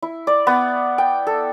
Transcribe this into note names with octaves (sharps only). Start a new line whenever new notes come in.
E4
D5
B3
G5
A4